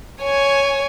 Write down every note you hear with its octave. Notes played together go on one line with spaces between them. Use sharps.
C#5 G#5